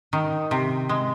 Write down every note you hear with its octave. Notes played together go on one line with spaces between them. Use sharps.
D#3
C3
G#3